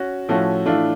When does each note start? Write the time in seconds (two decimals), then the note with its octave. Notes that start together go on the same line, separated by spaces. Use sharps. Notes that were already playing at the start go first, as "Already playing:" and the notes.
Already playing: C#4 F#4
0.28 A2 F3 A3 C#4 F#4
0.65 A2 E3 A3 D4 F4